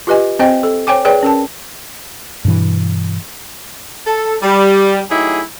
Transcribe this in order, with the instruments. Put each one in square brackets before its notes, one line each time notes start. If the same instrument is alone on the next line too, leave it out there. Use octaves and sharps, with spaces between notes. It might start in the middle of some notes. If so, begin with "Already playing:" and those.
[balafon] F4 G4 B4 D#5 G#5
C4 C5 D#5 G5
A4
C5 C#5 G5 G#5 D6
G#4 B4 C#5 D5 G5
C#4 A#4 A5
[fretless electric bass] G2 B2 E3
[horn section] A4
G3
F#3 A3 D#4 E4 G4 G#4